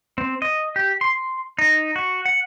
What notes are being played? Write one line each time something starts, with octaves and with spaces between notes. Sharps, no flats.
C4
D#5
G4
C6
D#4
F#4
F#5